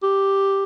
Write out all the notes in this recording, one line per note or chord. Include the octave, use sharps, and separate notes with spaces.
G4